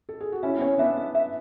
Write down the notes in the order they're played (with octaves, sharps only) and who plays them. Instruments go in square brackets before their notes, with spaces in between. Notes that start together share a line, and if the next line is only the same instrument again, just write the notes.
[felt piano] A4
G#4
F#4
[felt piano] C#4 E4 [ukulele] E5
[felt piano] B3
[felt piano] C#4 [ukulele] C#5
[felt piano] B3 D4 [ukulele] E5
[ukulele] E5
E5